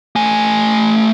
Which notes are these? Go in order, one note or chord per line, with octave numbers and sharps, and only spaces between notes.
A3 G#5